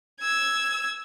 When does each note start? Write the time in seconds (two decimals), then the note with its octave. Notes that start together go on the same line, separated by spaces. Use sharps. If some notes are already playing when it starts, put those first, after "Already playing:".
0.20 E6 G#6